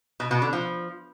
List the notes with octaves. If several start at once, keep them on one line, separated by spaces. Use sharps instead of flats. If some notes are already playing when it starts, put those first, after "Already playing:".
B2
B2
D3
F3